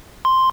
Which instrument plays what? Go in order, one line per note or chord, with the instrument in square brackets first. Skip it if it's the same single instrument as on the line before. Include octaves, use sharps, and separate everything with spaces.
[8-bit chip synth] C6